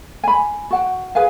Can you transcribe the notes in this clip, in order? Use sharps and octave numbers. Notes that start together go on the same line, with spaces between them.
G#5 B5
F#4 F#5 G5
G#4 B4 F5 G#5